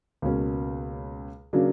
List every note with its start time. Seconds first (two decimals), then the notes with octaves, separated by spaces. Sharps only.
0.22 C#2 B2 A#3 C#4
1.53 C#3 F#3 A#3 D4